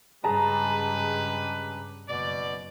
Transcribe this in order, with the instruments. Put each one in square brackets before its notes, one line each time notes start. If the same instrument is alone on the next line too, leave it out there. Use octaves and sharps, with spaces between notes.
[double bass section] G2 C#3 [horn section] G#3 G4 B4 [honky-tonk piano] G#4 A5 A#5
[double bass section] F#1 [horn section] B2 D5